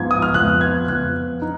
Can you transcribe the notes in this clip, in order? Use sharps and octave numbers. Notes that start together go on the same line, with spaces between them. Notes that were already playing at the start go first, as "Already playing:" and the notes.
Already playing: G#2 F3 B3 G#6
D#6
F6
F2 F3 B3 F#6
G#6
F2 F3 B3 F#6
D#4